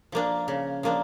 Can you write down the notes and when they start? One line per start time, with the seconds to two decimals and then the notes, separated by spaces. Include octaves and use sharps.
0.12 F3 A#3 D4
0.48 C#3
0.83 F3 A#3 D4